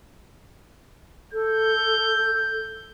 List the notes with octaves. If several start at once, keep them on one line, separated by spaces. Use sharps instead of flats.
A4 G6